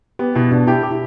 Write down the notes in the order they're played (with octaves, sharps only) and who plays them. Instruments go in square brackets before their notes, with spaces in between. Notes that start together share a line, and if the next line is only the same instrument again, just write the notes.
[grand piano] B3 [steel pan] G4
[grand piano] B2 [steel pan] E4
[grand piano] B2 [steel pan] D4
[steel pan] E4 [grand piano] G4
[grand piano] G4
[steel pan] E4